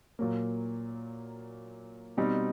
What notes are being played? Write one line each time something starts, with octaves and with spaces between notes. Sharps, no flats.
A#2 F#3 A#3
B2 G3 C4 D#4